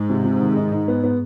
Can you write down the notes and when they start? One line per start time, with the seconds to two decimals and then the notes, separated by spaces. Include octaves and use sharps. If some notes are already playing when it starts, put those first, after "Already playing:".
Already playing: G#2
0.10 C3
0.25 C3
0.41 D#3
0.57 D#4
0.72 D#4
0.88 B3
1.04 B3